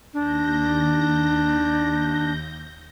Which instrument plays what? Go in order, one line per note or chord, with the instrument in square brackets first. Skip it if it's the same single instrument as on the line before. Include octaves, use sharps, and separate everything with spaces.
[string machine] D#2 G6 A#6 [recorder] D4